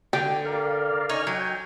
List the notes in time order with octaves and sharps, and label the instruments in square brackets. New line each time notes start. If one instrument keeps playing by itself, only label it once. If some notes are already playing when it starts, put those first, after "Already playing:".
[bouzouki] D3 [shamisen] G4
[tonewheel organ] A#4 D5 F5
[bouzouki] D#4 C#5 [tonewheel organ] G#5 F6
[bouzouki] F#3 [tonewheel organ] G5 G#5